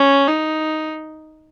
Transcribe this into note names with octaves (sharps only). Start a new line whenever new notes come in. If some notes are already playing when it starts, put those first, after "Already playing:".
Already playing: C#4
D#4